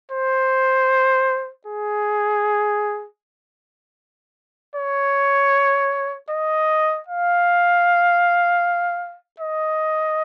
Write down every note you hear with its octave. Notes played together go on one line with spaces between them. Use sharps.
C5
G#4
C#5
D#5
F5
D#5